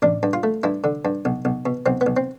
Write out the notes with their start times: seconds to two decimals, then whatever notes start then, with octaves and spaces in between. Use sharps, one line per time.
0.02 A1 D4
0.23 G2
0.33 F4
0.43 A3
0.63 G2 E4
0.84 D3
1.05 G2
1.25 B1
1.45 B1
1.66 B2
1.86 B1 C4
2.01 B3
2.07 B1
2.17 C4